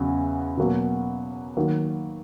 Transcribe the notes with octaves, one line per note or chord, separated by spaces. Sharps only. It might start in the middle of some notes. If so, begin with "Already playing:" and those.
Already playing: E2 C#3 F#3
B2 F#3 A#3
D#3 F#3 A#3